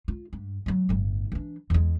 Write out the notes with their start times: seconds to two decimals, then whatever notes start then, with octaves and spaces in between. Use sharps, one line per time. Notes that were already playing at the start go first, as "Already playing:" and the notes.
0.08 F4
0.33 G2
0.66 F#3 G#3
0.89 G1 A2
1.32 E3 D4
1.70 E2 G#3